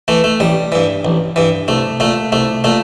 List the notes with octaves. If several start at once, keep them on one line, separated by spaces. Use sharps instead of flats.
E3 A3
A3
A1 G3
G2 E3
A1
G2 E3
C2 A3
A#2 A3
C2 A3
A#2 A3